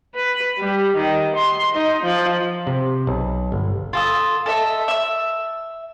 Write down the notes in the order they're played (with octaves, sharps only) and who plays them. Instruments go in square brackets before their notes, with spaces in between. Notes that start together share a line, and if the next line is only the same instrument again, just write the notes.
[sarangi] B4
G3
D#3
C6
D#4
F3
[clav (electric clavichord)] C3
B1
G1
[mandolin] F4 A4 D#6
A4 D#5 E5
E5 E6